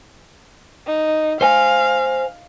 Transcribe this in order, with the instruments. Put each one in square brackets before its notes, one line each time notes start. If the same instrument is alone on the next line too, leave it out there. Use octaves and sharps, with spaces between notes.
[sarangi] D#4
[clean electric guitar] C5 G#5 [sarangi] F5